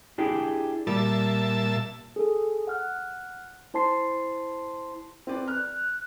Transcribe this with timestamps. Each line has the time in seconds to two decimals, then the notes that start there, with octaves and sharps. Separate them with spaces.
0.18 D4 E4 G4 G#4
0.87 A#2 G3 E5 A5
2.16 G#4 A4
2.67 F#5 F6 F#6
3.74 E4 C5 A5 C6 C7
5.27 C4 B4 D5
5.48 F6 F#6